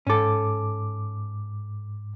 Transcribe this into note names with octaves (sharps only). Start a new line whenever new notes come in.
G#2 C#4 A4 D6